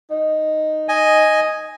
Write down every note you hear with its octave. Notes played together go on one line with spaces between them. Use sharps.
D#4
D#5 G#5